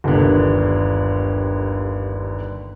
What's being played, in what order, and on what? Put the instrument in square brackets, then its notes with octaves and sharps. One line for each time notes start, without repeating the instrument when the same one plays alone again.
[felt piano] G1 D#2 D3